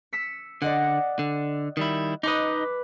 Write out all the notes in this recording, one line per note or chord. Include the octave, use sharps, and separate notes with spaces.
E6 B6 C#7
D3 D5 D#5 F#5
D3
D#3 G3 E4
D#4 B4 D#5 B5 D6